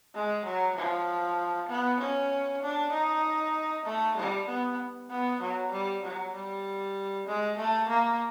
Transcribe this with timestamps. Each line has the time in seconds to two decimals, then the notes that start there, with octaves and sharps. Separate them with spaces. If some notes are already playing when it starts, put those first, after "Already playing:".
0.15 G#3
0.45 F#3
0.76 F3
1.69 B3
2.00 C#4
2.63 D4
2.93 D#4
3.86 A3
4.17 G3
4.48 B3
5.10 B3
5.41 F#3
5.72 G3
6.03 F#3
6.34 G3
7.27 G#3
7.58 A3
7.89 A#3